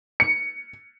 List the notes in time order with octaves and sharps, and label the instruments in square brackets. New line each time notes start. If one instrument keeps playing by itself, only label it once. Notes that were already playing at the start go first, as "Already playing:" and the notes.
[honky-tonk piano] C#7